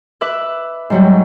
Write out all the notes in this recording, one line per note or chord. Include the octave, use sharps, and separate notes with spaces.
B4 E5 D6 F#6
G#2 F#3 G3